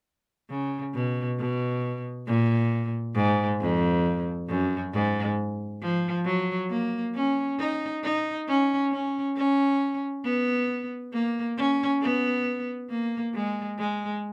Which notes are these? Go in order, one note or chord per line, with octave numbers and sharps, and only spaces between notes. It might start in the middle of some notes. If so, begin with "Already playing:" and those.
C#3
B2
B2
A#2
G#2
F2
F#2
G#2
F3
F#3
A#3
C#4
D#4
D#4
C#4
C#4
C#4
B3
A#3
C#4
B3
A#3
G#3
G#3